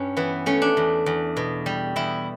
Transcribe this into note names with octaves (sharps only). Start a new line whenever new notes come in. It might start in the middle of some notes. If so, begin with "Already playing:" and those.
Already playing: G2 C#4
E3 B3
A3 C#4
D4
E2
E2
B2
G3
E2 E4